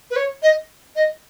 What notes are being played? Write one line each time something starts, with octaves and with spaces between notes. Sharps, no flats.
B4
C#5
D#5
D#5